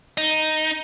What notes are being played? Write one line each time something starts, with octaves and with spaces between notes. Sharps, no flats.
D#4